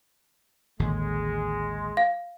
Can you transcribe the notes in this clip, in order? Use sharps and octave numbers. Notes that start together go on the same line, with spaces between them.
A1 D#2 D3 G#3
F5